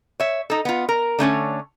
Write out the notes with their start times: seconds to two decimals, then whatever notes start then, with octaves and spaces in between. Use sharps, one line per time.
0.20 C#5 E5
0.50 D#4 A4
0.65 B3 F4
0.89 A#4
1.19 D3 A3 C#4 C#5